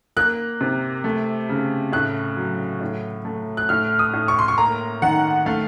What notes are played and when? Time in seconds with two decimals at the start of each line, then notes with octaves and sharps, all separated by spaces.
0.16 A#3 F#6
0.61 C3
1.04 A3
1.49 C#3
1.92 A2 F#6
2.36 F#3
2.81 A2
3.25 A3
3.57 F#6
3.69 A2 F6
3.99 D#6
4.13 A2
4.28 C#6
4.39 C6
4.48 C#6
4.58 A#3 A#5
5.02 D#3 F#5
5.46 A3 F5